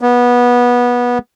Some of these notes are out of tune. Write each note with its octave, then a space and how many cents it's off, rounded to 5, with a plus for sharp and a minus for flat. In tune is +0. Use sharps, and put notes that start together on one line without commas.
B3 -20